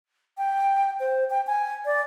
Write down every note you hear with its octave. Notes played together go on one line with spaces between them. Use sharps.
G5
C5
G5
G#5
D5